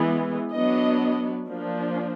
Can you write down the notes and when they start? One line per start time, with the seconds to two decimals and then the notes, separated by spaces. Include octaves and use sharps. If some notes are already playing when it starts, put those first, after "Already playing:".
Already playing: E3 G#3 B3
0.53 F#3 B3 D4 D#5
1.48 F3 A#3 D4